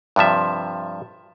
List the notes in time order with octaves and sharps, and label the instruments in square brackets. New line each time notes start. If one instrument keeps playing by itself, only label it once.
[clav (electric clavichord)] G2 C3 F3 E5